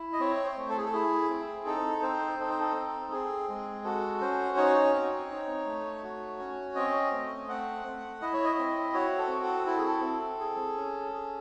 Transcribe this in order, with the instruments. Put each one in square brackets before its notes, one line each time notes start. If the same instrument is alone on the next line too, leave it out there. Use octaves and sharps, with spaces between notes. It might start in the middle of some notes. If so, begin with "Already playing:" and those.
Already playing: [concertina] E4
D#5
C4 C#5
C5
A3
A4
G#4
A4
E4 G#4
C4
D#4 A4
C4 C5
D#4 A4
C5
A4
C4
C4 G#4
G#3
F#4 A4
C#4 C5
D#4 C#5
C4
D#4
A3
F#4
C#4
C4 D#5
A3
C4 F#5
A3
E4 D#5
C#5
D#5
C4
F#4 C#5
A4
C4
A4
E4 A4
G#4
A4
C4
G#4
C#4
G#4